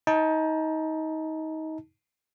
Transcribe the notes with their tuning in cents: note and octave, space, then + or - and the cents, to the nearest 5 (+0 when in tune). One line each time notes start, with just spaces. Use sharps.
D#4 +25 A5 +0